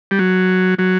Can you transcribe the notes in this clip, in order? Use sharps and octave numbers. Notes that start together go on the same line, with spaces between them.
G3
F#3
F#3